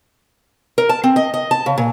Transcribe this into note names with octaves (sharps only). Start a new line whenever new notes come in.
A#4
A5
C4
D#5
D#5
A5
C#3
A#2